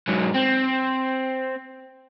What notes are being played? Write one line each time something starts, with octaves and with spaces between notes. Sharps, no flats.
G#2 F#3
C4